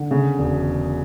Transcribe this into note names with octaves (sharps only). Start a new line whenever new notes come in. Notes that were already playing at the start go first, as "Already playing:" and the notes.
Already playing: D3
C#3
E1